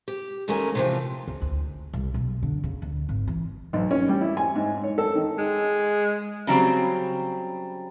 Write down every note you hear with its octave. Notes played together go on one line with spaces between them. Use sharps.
G4
D#2 G#3 A3 C#4 A#4 G#5
C3 E3 F3
C#2
D2
C2
B1
D3
C#3
D2
G#1
E3
B1
C#4
G3
E4
G#5
G#2
C#5
A4
D#3
G#3
C#3 F#3 G3 C4